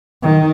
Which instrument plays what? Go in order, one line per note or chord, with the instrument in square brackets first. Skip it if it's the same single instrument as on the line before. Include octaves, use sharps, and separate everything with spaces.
[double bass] D#3